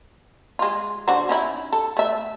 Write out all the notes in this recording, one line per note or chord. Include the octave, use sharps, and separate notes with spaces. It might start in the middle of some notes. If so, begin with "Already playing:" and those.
G#3 F4
D3 F#4 C5
C#4 D#4 E4
A4
A3 E5